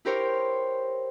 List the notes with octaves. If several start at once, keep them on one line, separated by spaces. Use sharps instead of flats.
E4 G4 A#4 C5 C#5